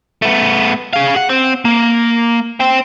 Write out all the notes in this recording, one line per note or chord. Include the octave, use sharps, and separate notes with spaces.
A3 B3
G#4 F5
F#5
C4
A#3
C5 G5